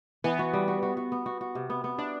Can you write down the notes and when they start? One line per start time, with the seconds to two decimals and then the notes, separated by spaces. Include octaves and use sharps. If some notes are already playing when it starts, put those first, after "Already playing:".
0.24 E3 B3
0.39 F#4
0.53 G3
0.68 F#4
0.83 F#4
0.97 F#4
1.12 B3
1.26 F#4
1.41 F#4
1.55 C3
1.70 B3
1.84 B3
1.98 D4 E4